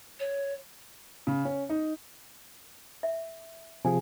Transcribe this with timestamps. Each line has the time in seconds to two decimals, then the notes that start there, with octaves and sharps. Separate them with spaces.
0.19 C#5
1.27 C#3
1.45 C#4
1.69 D#4
3.03 E5
3.85 C3 F3 G#4 G#5